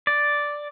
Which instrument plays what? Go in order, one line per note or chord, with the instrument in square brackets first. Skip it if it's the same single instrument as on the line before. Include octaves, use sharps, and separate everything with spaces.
[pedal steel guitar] D5